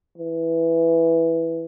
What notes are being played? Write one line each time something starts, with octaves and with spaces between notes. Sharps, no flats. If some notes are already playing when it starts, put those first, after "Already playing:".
E3